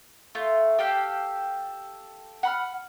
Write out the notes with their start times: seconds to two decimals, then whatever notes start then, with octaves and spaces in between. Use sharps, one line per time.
0.35 A3 F4
0.78 G4 A4 F5 G5
2.43 F#5 B5 F6